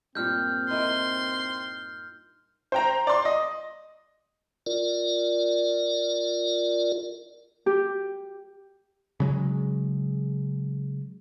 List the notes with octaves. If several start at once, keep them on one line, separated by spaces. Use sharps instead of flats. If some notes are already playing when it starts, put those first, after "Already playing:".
G2 A#2 C4 F6 G6
D#4 E4 A#4 C6
C5 G5 A#5
D5 C6
D#5
F4 A#4 D5
G4
C#3 F#3 G#3